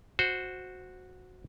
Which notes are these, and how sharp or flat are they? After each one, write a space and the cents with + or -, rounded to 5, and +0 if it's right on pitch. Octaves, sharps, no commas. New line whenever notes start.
F#4 -10 C5 +0